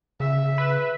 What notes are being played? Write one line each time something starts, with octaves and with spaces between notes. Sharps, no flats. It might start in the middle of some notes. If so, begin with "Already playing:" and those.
C#3 E5
B4